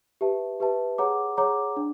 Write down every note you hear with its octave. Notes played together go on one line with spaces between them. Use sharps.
G4 B4 E5 A5
G4 B4 E5 A5
G#4 C#5 F#5 A#5 D6
G#4 C#5 F#5 A#5 D6
D4